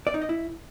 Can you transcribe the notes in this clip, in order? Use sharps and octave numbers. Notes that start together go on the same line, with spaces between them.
D5
D#4
D#5
E4